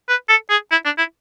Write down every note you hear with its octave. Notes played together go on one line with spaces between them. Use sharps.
B4
A4
G#4
E4
D4
E4